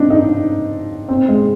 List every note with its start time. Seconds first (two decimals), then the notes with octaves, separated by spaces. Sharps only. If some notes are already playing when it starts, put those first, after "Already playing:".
Already playing: C4 D4 D#4
0.10 D#4
1.08 C4
1.29 G#3